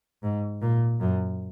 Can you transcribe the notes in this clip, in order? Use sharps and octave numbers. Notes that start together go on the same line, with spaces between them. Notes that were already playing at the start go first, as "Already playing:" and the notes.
G#2
A#2
F#2